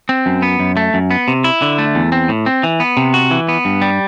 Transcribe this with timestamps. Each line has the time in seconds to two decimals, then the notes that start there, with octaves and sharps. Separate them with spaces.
0.09 C4
0.26 F#2
0.42 B3
0.59 F#2
0.77 A3
0.94 F#2
1.11 B3
1.28 C3
1.44 E4
1.62 D3
1.78 A3
1.95 E2
2.12 C4
2.29 A2
2.46 C4
2.63 E3
2.80 B3
2.97 C3
3.14 F#4
3.31 E3
3.49 B3
3.65 G2
3.82 G3